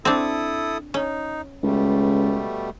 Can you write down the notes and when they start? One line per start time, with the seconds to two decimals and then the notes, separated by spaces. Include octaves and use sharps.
0.05 C4 D4 E4 A4 D#6
0.94 C#4 D#4
1.63 C#2 B2 G3 A3